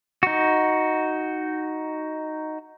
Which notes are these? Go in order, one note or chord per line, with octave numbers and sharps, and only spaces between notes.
D#4 F#4